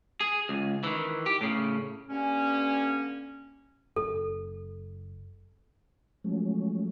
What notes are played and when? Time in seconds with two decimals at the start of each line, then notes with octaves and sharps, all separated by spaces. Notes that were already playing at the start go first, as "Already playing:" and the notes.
0.20 G#4
0.49 C#2
0.84 D#3 E3
1.26 G4
1.41 A2 C#3
2.09 G2 D3 A#3 C#4
3.96 F#1 A4
6.24 F3 F#3 G#3 A3 C#4